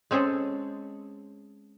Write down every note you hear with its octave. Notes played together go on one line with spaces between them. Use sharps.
G#3 C4 C#4 G#4 A4